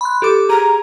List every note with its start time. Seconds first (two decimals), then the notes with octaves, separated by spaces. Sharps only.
0.01 B5 C6 F#6
0.22 G4 A4 D6
0.50 G#4 A#5